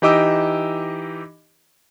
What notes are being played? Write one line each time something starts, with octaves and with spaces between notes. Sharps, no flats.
E3 D#4 G4 D#5 D6 E6